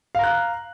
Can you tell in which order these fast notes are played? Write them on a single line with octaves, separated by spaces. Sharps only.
F5 A#5 F#6